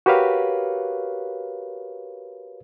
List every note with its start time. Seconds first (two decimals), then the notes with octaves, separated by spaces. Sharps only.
0.06 F#4 G4 A#4 B4 C#5 F5